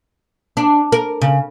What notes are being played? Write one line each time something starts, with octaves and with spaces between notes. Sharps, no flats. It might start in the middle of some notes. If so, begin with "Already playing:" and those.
D4
A#4
C#3